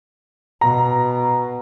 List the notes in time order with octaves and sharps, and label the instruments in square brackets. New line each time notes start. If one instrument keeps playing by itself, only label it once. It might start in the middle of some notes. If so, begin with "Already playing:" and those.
[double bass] B2 [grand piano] A#5